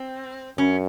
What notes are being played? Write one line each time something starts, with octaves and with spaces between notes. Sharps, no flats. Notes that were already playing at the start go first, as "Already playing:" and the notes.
Already playing: C4
F#2 C#4